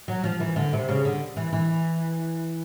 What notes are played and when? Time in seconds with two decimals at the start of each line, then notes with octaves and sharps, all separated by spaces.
0.08 F#3
0.24 F3
0.40 E3
0.56 D3
0.73 C3
0.89 C#3
1.05 D3
1.37 E3
1.53 E3